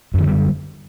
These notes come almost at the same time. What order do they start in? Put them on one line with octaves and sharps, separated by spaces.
F#2 D#3 D3 G3